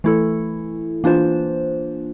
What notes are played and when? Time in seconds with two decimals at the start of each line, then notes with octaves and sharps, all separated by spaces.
0.04 E3 A3 E4 A4
1.04 E3 A#3 D4 F4 C5